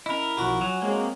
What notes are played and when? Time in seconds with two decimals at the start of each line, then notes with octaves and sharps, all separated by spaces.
0.06 C#4 E4 A#4 D#5
0.37 B1 F3 F4 F#4 D6
0.61 F#3 G#5
0.82 G#3 A#3 C4 G#4 C#5